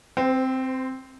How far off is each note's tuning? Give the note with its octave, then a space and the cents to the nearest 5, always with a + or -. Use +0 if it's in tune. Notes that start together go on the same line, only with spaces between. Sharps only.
C4 +0 C5 -30